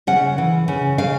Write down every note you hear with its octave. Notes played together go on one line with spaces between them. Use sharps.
C#3 F#5
E3
C#3
C#3 F5